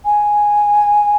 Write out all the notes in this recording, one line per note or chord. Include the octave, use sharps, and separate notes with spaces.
G#5